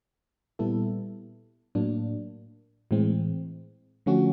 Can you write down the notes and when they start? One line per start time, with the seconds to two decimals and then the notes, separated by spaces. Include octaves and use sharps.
0.59 A#2 G3 B3 E4 A4
1.75 A2 F#3 A#3 D4
2.91 A2 E3 G#3 C4
4.06 D3 F3 A3 C#4 F#4